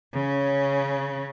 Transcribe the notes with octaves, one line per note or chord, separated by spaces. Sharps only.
C#3 C#4